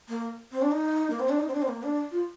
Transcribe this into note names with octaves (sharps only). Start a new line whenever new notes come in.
A#3
C4
D4
D#4
A#3
C4
D4
D#4
C4
D4
C4
A#3
D4
F4